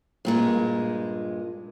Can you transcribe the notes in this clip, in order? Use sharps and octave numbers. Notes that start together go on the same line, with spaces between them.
G2 A#2 G#3